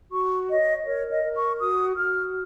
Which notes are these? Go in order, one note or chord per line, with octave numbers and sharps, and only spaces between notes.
F#4 C#6
C#5 D#5
A#4 C#5
D#5
A#4
C#6
F#4 D#6
F#4 F6